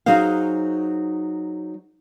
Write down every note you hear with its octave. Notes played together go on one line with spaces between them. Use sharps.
F#3 D#4 G#4 C5 F5